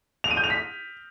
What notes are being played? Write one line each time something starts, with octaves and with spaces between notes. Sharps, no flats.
F7
D#7
G6
F7
B6